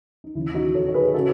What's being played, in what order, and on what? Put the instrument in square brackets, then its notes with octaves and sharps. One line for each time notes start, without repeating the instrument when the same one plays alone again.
[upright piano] D#4
D#2 C#3 E3 E4
D#4 F#4
A4 C#5
C#5
G#4 B4
B4
C#3 F#4 A4